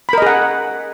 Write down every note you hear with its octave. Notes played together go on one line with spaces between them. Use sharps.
G#4 A#4 D#5 F#5 B5